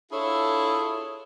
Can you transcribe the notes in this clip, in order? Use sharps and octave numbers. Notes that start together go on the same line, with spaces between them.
D4 E4 F4 G#4 A4 C#5